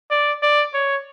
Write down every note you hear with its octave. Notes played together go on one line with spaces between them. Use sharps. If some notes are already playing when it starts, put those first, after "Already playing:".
D5
D5
C#5